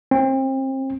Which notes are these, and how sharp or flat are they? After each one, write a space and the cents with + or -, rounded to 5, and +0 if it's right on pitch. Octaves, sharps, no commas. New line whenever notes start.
C4 +30